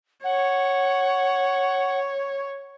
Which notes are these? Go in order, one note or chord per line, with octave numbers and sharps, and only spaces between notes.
C#5 F#5